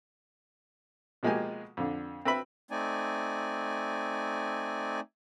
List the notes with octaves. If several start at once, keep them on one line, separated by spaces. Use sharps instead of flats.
B2 F3 G#3 A#3 G4 G#5
F2 D3
C4 B4 E5 B5
A3 C4 D#4 D5 G#5